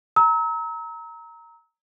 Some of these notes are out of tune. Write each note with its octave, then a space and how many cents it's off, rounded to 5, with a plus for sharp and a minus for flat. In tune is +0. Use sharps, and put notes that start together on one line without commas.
A#5 -5 E6 -40